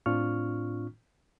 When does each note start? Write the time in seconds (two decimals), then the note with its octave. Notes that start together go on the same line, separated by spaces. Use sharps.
0.06 A2 C4 D4 F4 C#6 F6